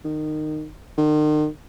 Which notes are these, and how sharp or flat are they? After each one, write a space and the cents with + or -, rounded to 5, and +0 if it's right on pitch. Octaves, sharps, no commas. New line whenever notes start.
D#3 -20
D#3 -40